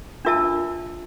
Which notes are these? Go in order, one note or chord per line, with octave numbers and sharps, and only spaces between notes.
D4 F4 A#4 E5 A5